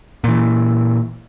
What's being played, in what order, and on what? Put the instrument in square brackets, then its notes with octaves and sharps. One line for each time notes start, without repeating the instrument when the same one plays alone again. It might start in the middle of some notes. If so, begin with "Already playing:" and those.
[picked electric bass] A#2 E3